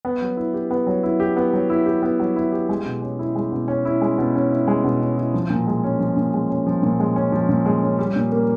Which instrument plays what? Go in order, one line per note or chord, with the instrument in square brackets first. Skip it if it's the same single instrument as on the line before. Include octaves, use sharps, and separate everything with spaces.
[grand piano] B3
F#3
E4
G4
B3
F#3
E4
G4
B3
F#3
E4
G4
B3
F#3
E4
G4
G#3
B2
C#4
E4
G#3
B2
C#4
E4
G#3
B2
C#4
E4
G#3
B2
C#4
E4
F3
A#2
G#3
C#4
F3
A#2
G#3
C#4
F3
A#2
G#3
C#4
F3
A#2
G#3
C#4
G3
A#2
A#3